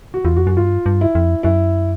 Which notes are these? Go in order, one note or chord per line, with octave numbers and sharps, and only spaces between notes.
F#4
E2 F4
F2 F#4
F#2 F#4
G2 F4
G2
E4
F2
F#2 E4